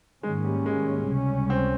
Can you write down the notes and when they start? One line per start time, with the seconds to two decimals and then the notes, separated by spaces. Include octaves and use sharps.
0.23 G#2 D#3 G#3 A#3 C#4
0.45 G3
0.66 G#3
1.07 C#2 C3 G3 C#4
1.50 C4